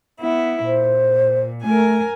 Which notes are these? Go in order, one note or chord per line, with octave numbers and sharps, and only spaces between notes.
B3 E4
A#2 C5
A3 A#4 G#5